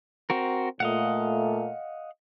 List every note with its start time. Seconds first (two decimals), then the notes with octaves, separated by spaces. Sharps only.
0.30 C4 F#4 A#4
0.80 A#2 A3 D#5 F5 F#5